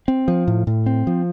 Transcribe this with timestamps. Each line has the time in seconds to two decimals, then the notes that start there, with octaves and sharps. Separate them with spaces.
0.08 C4
0.28 F3
0.47 A2
0.67 A2
0.86 C4
1.07 F3